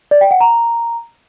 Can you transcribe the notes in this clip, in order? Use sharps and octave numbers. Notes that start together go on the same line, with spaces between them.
D5
G5
F#5
A#5